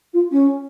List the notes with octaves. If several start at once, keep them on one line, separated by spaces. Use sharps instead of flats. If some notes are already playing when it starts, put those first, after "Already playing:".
F4
C#4